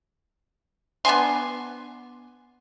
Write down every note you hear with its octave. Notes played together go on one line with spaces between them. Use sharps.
B3 D4 G#5 C6